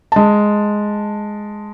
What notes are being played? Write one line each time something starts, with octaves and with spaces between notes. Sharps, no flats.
G#3 A5